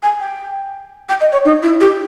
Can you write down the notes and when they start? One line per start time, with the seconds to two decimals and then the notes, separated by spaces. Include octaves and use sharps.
0.03 G#5
0.20 G5
1.09 G5
1.20 D#5
1.32 C#5
1.45 D#4
1.63 E4
1.80 G4